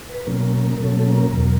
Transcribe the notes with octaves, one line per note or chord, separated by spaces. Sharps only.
B4
B2 F#3 A#3 C#4 A#4
A#4
B2 F#3 A#3 C#4 A4
A#4
E2 B2 F#3